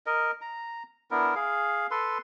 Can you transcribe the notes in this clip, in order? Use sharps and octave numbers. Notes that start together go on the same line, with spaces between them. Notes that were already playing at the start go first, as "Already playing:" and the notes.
A#4 D#5
A#5
B3 D4 E4 A#4
G#4 F5
A4 B4 C6